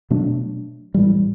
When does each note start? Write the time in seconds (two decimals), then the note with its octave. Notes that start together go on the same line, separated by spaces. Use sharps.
0.10 B2 F#3 A3 D4
0.94 A2 E3 G3